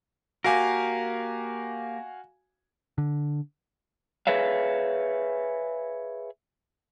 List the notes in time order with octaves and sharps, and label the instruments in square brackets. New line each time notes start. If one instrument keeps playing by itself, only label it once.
[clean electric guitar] A#3 G4 A#4 [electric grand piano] F#4 F5 G#5
[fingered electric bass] D3
[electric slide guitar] G#4 B4 C#5 E5 F5